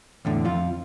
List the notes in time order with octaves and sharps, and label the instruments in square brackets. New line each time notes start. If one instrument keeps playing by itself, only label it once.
[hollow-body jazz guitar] E2 A2 D3
F2 F4